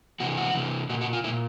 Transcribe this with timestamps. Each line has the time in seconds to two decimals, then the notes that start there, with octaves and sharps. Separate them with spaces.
0.20 C3 E3 F#4
0.37 F#4
0.55 C3 E3
0.89 A#2 F#4
1.01 F#4
1.13 F4
1.24 A#2 E4